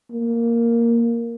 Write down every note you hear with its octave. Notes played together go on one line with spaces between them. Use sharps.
A#3